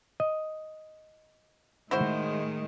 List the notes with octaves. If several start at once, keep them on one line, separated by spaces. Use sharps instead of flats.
D#5
A2 D#3 G#3 E4 F#4 C5